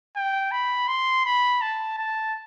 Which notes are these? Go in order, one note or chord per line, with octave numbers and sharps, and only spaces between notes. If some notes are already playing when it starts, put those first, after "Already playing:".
G5
B5
C6
B5
A5
A5